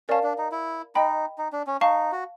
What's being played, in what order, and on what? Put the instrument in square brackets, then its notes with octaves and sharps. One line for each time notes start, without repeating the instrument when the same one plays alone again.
[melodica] C#4 [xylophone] A#4 D5 F5 A5
[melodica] D4
D#4
E4
[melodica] D#4 [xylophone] D#5 G5 B5
[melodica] D#4
D4
C#4
[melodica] D#4 [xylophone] F5 A5 C#6
[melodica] F#4